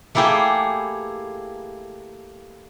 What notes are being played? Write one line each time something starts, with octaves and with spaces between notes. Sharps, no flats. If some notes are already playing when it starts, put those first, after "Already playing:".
A3 A#3 E4 G4 G#4 G5